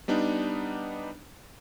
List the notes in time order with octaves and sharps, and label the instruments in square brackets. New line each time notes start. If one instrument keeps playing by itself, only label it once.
[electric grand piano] G3 B3 D4 D#4